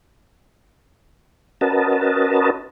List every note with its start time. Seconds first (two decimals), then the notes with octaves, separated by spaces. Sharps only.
1.61 C#4 F#4 A#4 B4 D#5 A5